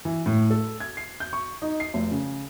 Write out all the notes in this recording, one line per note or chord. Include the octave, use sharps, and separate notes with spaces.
E3
A2
A4
G#6
C7
G6
C#6
D#4
C7
F1
C#3